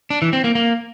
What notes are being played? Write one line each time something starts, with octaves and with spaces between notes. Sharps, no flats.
D4
E3
C4
A#3
A#3